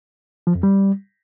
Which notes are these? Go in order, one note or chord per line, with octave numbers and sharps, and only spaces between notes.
F3
F2
G3